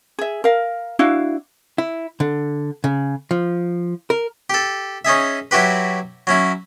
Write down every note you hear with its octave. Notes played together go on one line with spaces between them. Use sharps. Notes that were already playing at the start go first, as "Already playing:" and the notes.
G#4 E5
A#4 F5
D4 E4 F#4 F5
E4
D3
C#3
F3
A#4
G4 A4
C#4 D#4 G#4 E5
F#3 E4 F#4 G4 B4
F#3 C#4 E4